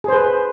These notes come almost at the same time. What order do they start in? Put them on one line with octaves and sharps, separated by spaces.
G#4 C5 B4